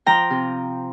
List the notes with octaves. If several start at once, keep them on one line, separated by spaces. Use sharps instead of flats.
F3 G5 A#5
C3